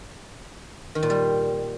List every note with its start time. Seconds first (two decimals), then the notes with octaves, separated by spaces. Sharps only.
0.95 D#3
1.03 A#2
1.10 G3